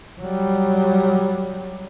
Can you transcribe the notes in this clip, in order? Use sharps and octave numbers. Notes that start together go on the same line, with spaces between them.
F#3 G3